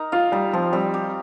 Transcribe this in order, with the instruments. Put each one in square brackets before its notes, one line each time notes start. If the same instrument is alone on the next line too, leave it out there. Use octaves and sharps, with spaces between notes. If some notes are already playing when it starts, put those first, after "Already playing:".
Already playing: [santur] D#4 A#4
[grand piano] F4 [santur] F5
[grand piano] G3 [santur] D#4
[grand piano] F3 [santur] C4
[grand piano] G3 [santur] C4
[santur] G4